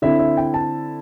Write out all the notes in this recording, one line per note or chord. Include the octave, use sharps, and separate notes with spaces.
D3 C4 E4 E5
E5
G5
A5